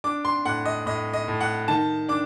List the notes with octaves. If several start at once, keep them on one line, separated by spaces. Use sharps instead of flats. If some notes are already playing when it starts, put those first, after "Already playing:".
D4 D6
C6
A2 F#5
D#5
A2 D#5
D#5
A2
F#5
D#3 A5
D4 D6